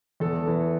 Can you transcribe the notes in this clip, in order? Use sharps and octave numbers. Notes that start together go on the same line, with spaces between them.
E2 A4
E3